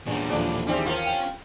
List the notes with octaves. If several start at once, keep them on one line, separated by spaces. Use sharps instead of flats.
E2 A#2 C#4 D4
A#1 D#2 A2 E3 F3 D4
D#3 G3 C4 E4 G#4
F3 C#4 F4 A#4
G5